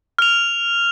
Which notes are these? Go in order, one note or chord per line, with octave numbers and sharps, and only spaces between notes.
F6 F7